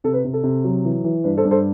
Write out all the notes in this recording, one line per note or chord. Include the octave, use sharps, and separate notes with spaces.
C3 A4
B4
C3
A4
C3
F#3
E3
E3
G2 B4
A4 C5
G2
A4 C5